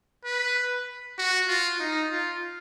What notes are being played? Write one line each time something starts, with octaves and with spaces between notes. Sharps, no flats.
B4
F#4
F4
D#4
F4